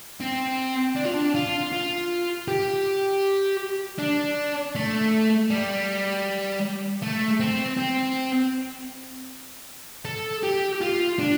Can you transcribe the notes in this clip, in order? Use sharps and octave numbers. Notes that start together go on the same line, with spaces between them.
C4
D4
F4
D4
F4
F4
G4
D4
A3
G3
A3
C4
C4
A4
G4
F4
D4